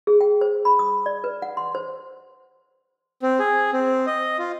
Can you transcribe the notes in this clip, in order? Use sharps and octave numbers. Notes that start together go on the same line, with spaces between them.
G#4
G5
C5
B5
D#6
D5
B4
F#5
C6
C5
C4
G#4
C4
D#5
F4